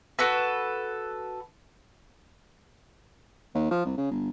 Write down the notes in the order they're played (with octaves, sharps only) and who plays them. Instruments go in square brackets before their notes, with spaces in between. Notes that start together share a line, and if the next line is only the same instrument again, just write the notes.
[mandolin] F#4 A4 B4
[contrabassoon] D#2
F3
C2
C#3
G1